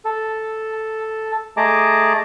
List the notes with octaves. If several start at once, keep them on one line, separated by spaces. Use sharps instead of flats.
A4
A3 G#4 D#5 A5 A#5 D6